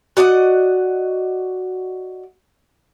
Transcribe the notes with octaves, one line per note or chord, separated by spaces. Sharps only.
F#4 D5 D#5 F#5